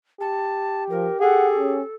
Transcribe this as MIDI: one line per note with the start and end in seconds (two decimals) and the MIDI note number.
0.21 1.83 67
0.21 0.84 81
0.90 1.09 53
0.90 1.17 70
1.21 1.76 68
1.21 1.95 69
1.21 1.48 78
1.58 1.82 61